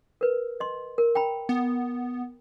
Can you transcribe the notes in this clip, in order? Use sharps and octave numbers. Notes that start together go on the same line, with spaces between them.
A#4 B4
D#5 C6
A#4
G5 A#5 B5
B3